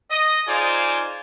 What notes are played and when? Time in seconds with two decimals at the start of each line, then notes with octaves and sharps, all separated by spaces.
0.11 D#5
0.47 D#4 F4 G#4 C5 D5 G#5